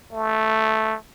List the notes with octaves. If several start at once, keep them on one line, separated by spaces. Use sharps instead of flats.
A3